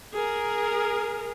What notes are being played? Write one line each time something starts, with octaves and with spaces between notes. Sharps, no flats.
G#4 A#4